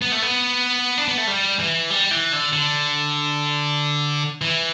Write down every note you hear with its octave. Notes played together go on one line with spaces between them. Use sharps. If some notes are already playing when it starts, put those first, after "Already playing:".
B3
A3
B3
D4
B3
A3
G3
E3
G3
E3
D3
D3
E3